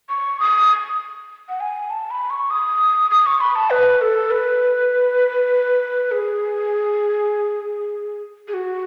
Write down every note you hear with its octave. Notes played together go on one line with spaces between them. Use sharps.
C#6
D#6
F#5
G#5
A5
B5
C#6
D#6
D#6
C#6
B5
A5
B4
A4
B4
G#4
G#4
F#4